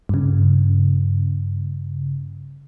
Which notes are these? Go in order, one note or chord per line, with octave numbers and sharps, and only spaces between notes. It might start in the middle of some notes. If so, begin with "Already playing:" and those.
G2 C#3